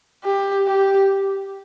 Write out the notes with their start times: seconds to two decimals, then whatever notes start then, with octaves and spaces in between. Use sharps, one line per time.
0.24 G4
0.67 G4